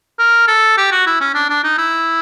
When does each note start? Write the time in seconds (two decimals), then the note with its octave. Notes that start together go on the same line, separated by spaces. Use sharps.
0.19 A#4
0.47 A4
0.77 G4
0.91 F#4
1.06 E4
1.21 C#4
1.34 D4
1.50 D4
1.64 D#4
1.78 E4